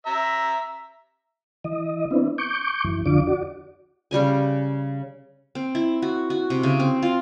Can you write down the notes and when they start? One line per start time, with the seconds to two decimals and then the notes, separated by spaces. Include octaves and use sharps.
0.06 E5 A#5
1.64 E3 D#5
2.11 B3 C4 D4 E4
2.38 C#6 D6 G6
2.84 F#2 E3
3.06 F2 D3 D4 F4 D6
3.27 F#4 D5
4.11 C#3 G3 C#4 G#5
5.55 C4
5.75 E4
6.02 F#4
6.30 F#4
6.50 C3
6.63 C#3
6.80 C4
7.02 F4